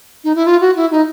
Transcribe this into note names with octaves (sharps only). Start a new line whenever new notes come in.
D#4
E4
F4
F#4
E4
D#4